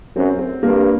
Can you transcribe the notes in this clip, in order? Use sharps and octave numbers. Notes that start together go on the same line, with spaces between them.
F#2 C4
C4
G2 A#3